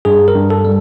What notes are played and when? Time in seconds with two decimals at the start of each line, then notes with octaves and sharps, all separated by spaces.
0.05 G2 G#4
0.28 A#4
0.35 G2
0.50 A4
0.65 G3